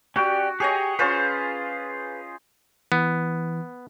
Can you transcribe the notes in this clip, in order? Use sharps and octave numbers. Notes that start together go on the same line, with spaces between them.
C#4 F#4 G4 D5
G4 G#4 C#5 D#5 G#5
C#4 F4 G#4 B4 C5
E3 B3